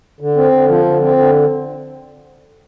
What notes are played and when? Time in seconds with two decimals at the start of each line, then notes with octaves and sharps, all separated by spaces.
0.20 D3
0.36 C4
0.52 D3
0.68 F3
0.85 D3
1.01 C4
1.16 D3